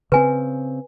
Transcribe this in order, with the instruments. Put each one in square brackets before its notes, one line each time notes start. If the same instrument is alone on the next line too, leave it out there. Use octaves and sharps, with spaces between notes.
[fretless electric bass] C#3 C4 [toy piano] B4 G#5